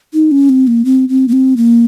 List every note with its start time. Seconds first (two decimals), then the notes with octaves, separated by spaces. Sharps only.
0.14 D#4
0.31 C#4
0.49 C4
0.67 A#3
0.85 C4
1.09 C4
1.28 A#3
1.33 C4
1.57 A#3